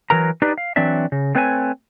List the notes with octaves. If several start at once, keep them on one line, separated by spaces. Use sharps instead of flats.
E3 F#3 A#4 A#5
D4 D#4 G4 B4 D5
F5
E3 F#3 C4 D4 D5 E5
C#3
A3 C4 B4 C#5 F5 G#5